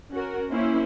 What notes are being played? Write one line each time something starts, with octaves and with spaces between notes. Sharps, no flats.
C#4 F#4 A#4
A#3 C#4 E4 C5